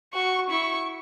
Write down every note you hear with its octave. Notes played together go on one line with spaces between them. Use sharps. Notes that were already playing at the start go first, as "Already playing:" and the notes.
F#4 C#6
E4 C#6